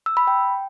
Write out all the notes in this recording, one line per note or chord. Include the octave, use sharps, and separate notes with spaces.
E6
B5
G5